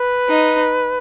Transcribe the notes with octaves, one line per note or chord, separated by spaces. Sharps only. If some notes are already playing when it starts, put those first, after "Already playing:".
Already playing: B4
D#4